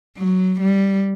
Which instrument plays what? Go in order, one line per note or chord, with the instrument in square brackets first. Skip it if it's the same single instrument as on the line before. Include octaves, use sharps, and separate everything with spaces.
[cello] F#3
G3